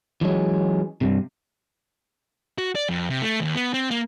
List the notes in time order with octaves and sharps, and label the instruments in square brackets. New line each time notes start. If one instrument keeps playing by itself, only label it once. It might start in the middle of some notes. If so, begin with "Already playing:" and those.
[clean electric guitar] E3 F#3 G#3 C#4
G2 C3
[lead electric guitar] F#4
D5
F2
C3
A3
D#2
B3
C4
A#3